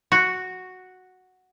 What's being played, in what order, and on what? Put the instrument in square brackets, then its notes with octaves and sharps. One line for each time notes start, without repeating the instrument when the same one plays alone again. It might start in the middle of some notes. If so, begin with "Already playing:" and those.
[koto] F#4